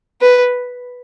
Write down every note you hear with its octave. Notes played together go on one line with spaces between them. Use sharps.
B4